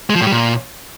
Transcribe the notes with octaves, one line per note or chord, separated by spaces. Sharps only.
G#3
F3
A2
G3
A#2